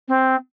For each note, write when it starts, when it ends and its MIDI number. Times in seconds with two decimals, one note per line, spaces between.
0.08 0.35 60